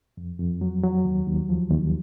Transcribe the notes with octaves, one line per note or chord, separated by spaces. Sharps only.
F2
F2
F#3
F#3
D#2
D#2
F3
D#2